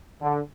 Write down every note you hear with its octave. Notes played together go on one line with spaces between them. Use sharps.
D3